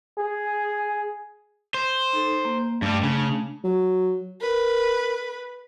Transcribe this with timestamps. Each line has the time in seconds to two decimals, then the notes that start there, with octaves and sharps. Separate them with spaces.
0.18 G#4
1.74 C5
2.13 D#4 A4
2.45 A#3
2.82 G2 G3 A3 D4
3.03 C#3
3.64 F#3
4.41 A#4 B4